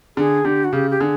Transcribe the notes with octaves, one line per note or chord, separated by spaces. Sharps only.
D3 G#4
D3 G4
F#4
C#3 G4
G4
D3 G#4